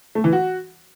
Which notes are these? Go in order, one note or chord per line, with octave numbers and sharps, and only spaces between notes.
A3
E3
F#4